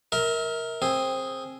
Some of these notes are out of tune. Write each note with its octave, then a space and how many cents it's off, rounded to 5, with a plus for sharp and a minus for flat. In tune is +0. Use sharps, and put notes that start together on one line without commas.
A#4 +0 E5 -35
C4 +15 G#4 +0